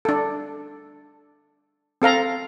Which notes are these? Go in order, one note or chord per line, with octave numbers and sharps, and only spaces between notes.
D4 A4
C4 A4 F5 A#5